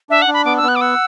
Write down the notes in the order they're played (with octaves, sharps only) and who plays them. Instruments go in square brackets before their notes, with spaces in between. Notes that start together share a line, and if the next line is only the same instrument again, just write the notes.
[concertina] D4 [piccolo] E5
[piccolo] F#5
[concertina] D4
[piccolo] B5
[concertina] B3 [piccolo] D6
[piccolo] E6
[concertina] B3
[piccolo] F#6
D6
[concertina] F#5 [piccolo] E6